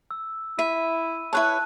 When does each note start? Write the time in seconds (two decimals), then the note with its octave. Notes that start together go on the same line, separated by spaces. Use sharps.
0.11 E6
0.59 E4 E5 D#7
1.33 E4 B4 C#5 A5 F#6